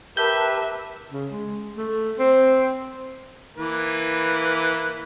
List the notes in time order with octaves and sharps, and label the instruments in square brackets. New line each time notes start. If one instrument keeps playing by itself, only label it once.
[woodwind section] G4 B4 [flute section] A#4 A5 [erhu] E5 [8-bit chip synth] G6
[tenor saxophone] C#3
G#3
A3
C4
[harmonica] E3 A#3 B4